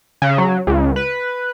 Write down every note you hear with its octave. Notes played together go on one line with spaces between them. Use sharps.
C#3
F#3
C#2
B4